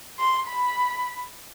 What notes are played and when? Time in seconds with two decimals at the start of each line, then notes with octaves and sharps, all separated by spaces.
0.19 C6
0.48 B5